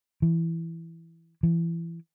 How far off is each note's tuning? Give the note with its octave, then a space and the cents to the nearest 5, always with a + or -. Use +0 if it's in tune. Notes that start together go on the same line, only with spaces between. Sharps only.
E3 +5
E3 +25